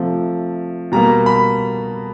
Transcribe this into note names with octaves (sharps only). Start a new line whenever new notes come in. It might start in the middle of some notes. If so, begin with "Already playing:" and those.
Already playing: C3 F3 A3
B2 G3 A#3 A#5
B5